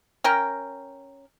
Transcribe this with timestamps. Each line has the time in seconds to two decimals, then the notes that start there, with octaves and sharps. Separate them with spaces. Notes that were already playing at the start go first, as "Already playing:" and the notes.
0.24 C#4 A#4 G5